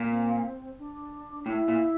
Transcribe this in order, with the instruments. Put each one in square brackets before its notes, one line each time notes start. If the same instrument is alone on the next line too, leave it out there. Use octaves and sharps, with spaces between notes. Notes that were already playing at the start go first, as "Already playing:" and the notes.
Already playing: [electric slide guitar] A#2
[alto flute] C4
D4
[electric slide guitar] A2 [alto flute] E4
[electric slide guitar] A#2